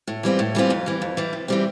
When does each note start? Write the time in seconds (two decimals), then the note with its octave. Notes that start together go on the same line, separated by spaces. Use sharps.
0.07 A2
0.23 E3 G3 C4 F4
0.39 A2
0.55 E3 G3 C4 F4
0.70 F2
0.86 E3 G3
1.02 F2
1.17 E3 G3
1.33 C3
1.48 E3 G3 C4